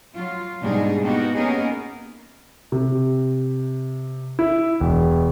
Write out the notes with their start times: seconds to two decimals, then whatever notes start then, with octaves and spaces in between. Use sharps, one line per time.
0.15 F#3 F4
0.61 G#2 B2 G3 D4 D#4 G#4
1.02 A#3 B3 D#4 F#4 G4
1.36 A#3 B3 C#4 D#4 G#4 A#4
2.72 C3
4.39 E4
4.80 E1